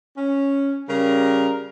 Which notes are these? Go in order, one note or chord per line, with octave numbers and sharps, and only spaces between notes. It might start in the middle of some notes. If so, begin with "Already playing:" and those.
C#4
C#3 G3 A#4